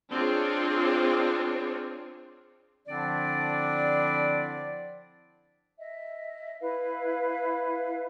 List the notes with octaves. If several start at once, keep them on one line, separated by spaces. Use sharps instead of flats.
C4 D4 F4 G#4 C#5
D3 F3 C4 D4 E4 D5
D#5 E5
E4 B4 E5 F5